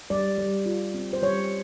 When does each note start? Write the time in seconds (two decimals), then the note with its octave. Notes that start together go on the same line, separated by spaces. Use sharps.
0.10 G3 D5
0.38 G3
0.66 F4
0.94 C4
1.13 C5
1.22 G3 C#5